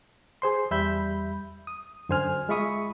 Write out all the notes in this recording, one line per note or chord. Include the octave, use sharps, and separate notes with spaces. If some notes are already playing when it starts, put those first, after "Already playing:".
G#4 C5 C6
E2 G3 E5 B5 G6
D#6
F#2 D3 C5 G#5 F6
G#3 F4 E5 B5 C#6 D#6